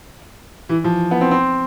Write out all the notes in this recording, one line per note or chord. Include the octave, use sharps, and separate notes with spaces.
E3
F3
B3
C4
C4